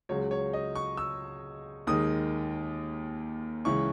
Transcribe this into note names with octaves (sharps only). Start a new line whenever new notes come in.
C#2 C#3 F#3 C#5
C#5
D#5
C#6
E6
D#2 D#3 G#3 D#6
C#2 C#3 E3 C#6